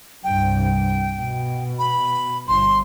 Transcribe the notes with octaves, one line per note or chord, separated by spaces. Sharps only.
C2 G2 G5
B2
B5
G1 C6